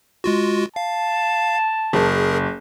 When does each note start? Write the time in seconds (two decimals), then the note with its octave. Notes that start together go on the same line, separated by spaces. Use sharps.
0.24 G#3 F4 F#4
0.76 F5 A5
1.93 F#1 G#4 A#4